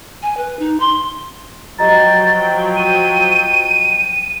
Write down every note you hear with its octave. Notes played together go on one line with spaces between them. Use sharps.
G#5
B4
D#4
C6
F3 F#3 G4 D#5 G5 A#5 A6
D#7